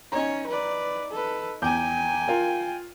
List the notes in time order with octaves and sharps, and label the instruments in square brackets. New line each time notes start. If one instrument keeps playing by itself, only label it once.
[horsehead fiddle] C#4 C#5 [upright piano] D#4 A#5
[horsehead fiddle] B4 D5
A4 B4
[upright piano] E2 D6 G6 [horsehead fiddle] G5 G#5
[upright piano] F4 A#4